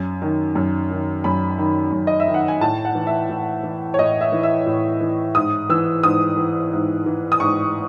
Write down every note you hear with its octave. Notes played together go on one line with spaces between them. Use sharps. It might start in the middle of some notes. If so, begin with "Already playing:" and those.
Already playing: F#2
D#3
F#2
D#3
F#2 B5
D#3
F#2
D#5
E5
D#3
F#5
G#5
A2 A5
F#5
E3
E5
A2
E3
C#5
A2 D#5
E5
E3
E5
A2
E3
G#2 D#6
E3 E6
G#2 D#6
E3
G#2
E3
D#6
G#2 C#6